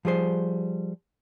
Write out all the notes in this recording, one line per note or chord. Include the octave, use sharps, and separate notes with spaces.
F3 G3 G#4 C5